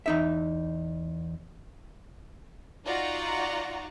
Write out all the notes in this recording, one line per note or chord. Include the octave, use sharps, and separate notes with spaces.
E2 D#4 E5
D#4 F4 F#4 D5 F#5 A#5